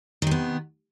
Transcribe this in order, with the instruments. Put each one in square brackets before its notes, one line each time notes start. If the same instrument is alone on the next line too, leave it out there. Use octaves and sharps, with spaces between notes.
[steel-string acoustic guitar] D#3
C3
B3